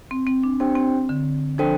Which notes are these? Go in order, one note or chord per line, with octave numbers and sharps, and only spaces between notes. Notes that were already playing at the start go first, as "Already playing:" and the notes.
C4
C4
D4
C4 D4 G4 C5 G5
C4
D3
F3 D4 A4 C5 G5